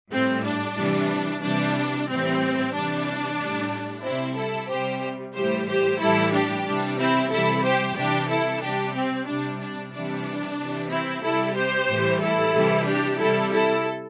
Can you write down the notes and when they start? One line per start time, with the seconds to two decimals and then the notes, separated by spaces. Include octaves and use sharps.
0.11 A2 G3 C4
0.45 D4
0.77 C3 E3 G3
1.43 C3 E3 G3 D4
2.08 A2 E3 G3 C4
2.73 C3 E3 G3 D4
3.39 A2 G3
4.04 C3 G3 C4 E4
4.37 E4 A4
4.69 C3 G3 G4 C5
5.34 A2 E3 G3 G4 C5
5.68 G4 C5
6.00 A2 E3 G3 E4 A4
6.33 D4 G4
6.66 C3 E3 G3 D4
6.99 C4 E4
7.31 C3 E3 G3 E4 A4
7.63 G4 C5
7.96 C3 E3 G3 D4 G4
8.29 E4 A4
8.62 C3 G3 D4 G4
8.95 C4
9.27 C3 G3 D4
9.60 D4
9.92 C3 E3 G3 D4
10.57 C3 E3 G3
10.91 C4 E4
11.23 C3 G3 E4 A4
11.56 G4 C5
11.88 A2 E3 G3
12.21 E4 A4
12.54 C3 E3 G3
12.87 D4 G4
13.19 C3 G3 E4 A4
13.52 E4 A4